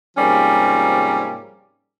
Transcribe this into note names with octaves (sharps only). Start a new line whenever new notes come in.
G#2 C3 F3 G3 A#3 C#4